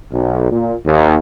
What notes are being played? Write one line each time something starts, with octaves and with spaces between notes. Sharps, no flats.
B1
A#2
D#2